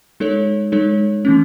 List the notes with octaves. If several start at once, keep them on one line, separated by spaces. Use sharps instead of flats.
G#3 D#4 A4 C#5
G#3 D#4 A4 C#5
E3 A3 C#4